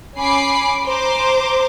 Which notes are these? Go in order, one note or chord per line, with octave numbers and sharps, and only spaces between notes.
C#4 G#5 B5 D6 C7 D7
C5 A#5 D6